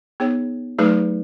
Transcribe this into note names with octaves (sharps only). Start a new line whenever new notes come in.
B3 D#4 G#4 C#5
F#3 A3 D#4 G#4 B4